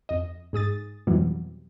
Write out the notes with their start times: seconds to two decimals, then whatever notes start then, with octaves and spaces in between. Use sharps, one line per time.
0.09 F2 D#5
0.53 G#2 G#4 D#6 A6
1.07 F2 B2 E3 F#3 G3